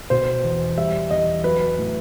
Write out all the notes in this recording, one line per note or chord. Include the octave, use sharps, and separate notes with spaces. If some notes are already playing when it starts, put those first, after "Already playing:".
B2 C5
E2
G3 E5
E2 D#5
F#3 B4
A2